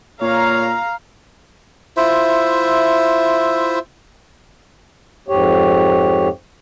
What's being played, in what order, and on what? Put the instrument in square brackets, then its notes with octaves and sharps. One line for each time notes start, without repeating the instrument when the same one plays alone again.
[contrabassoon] A#2 [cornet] C#5 [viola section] F5 A#5
[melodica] E4 F4 C5 E5
[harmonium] F2 G#2 G4 C#5